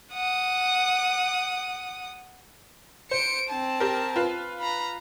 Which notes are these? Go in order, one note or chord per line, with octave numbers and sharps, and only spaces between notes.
F#5 D#6
C5 C#7 D7
C4 A5
G4 A#4
F4 B4
A#5 B5